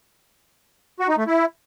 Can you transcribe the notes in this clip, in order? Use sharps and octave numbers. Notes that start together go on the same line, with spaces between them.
F#4
D#4
A3
E4